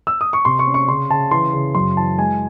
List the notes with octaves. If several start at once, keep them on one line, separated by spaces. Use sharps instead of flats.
E6
D#6
C#6
C3 C6
C#6
C#4
C#6
C#3 C6
C#3 A5
E3 C6
C#3
F#2 C6
E3 A5
G#3 G#5